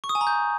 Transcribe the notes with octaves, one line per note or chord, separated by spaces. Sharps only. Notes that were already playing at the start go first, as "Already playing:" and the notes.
C#6
D#6
G#5
A#5
G6